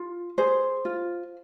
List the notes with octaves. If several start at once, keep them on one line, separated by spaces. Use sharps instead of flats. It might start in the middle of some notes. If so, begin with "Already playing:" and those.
Already playing: F4
G#4 C5
F4